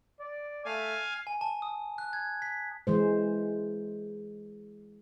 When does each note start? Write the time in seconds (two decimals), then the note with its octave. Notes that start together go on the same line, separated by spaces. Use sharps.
0.20 D5
0.65 A3 F5 G#5
1.27 G#5
1.41 A5
1.62 D#6
1.98 F#6
2.13 G#6
2.42 B6
2.87 E3 G#3 C5